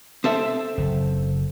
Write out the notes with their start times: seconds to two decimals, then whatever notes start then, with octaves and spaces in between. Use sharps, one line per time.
0.24 C4 A4 E5
0.78 F#1